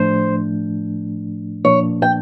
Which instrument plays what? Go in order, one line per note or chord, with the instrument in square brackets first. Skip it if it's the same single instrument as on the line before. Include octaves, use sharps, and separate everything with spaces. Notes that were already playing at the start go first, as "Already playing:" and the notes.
Already playing: [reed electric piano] A2 F3 A3 D4 [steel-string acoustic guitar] C5
[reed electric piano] A#2 F3 A#3 D4 [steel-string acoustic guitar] C#5
[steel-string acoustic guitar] G5